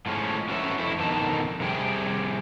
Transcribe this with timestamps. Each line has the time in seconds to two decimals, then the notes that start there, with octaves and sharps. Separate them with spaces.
0.06 A2 F3 G#3 B3 C#4
0.49 C#4 F#4 A4 B4 C#5 E5
0.79 F2 A2 E4
1.00 F2 B2 D3 D#3 D#4 A5
1.60 C3 G3 G#4 G5